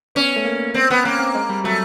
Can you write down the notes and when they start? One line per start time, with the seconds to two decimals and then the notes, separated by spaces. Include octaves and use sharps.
0.15 B3 C#4
0.36 A3
0.45 A#3
0.74 B3 C4
0.90 B3 C4
1.04 A#3 C#4
1.19 C4
1.35 G#3
1.49 G3
1.64 F#3 A3